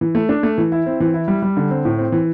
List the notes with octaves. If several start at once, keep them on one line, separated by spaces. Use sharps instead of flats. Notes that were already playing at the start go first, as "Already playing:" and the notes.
E3
A3
D4
A3
E3
E4
C4
E3
E4
G3
G3
D3
C4
A2
C4
E3